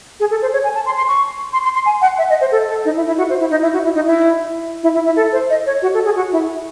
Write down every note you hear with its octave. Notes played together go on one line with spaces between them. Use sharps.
G#4
A4
C5
C#5
G#5
A5
C6
C6
C#6
C6
C6
C6
G#5
F#5
E5
D#5
C5
A4
A4
D#4
E4
E4
F#4
C5
E4
D#4
E4
F#4
E4
D#4
E4
E4
E4
E4
A4
C5
D#5
C#5
F#4
A4
G#4
F#4
E4